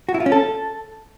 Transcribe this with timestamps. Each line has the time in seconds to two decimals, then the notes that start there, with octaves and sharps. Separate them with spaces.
0.09 F#4
0.14 E4
0.20 F4
0.26 C#4
0.32 A4